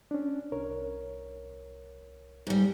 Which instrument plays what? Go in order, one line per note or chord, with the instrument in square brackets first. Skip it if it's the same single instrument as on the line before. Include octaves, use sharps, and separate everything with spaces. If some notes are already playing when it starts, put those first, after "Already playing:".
[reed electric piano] C#4 D4
C2 A#4 C#5
[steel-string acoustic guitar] G#2 G3